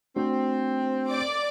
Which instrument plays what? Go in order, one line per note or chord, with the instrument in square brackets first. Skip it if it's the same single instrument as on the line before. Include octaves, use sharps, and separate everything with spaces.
[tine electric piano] A3 D4 F#4 [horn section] C4
[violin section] D5 D6